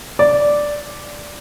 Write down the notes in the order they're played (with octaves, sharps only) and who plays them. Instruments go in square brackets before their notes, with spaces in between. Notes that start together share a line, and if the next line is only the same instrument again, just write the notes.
[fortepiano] D5